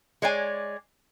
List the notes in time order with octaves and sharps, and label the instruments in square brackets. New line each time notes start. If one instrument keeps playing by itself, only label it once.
[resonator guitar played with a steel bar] G#3 C#5 D5 G#5